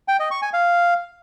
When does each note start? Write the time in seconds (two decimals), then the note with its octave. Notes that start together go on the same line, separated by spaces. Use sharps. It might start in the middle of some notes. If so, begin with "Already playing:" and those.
0.08 G5
0.19 D#5
0.31 C#6
0.42 G#5
0.53 F5